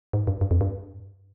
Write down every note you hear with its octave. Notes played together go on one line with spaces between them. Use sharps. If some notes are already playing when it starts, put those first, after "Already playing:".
G#2
G2
G2
F2
G2